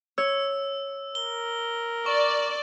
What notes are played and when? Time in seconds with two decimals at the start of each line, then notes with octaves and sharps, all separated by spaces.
0.18 C#5 E6
1.15 A#4 G7
2.06 D5 C#6